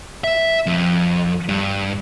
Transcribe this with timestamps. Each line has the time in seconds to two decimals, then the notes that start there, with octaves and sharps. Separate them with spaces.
0.24 E5
0.66 F2
1.49 G2